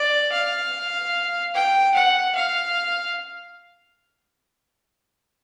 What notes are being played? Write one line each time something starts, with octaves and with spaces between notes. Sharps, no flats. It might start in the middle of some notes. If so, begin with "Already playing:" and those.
Already playing: D5
F5
G5
F#5
F5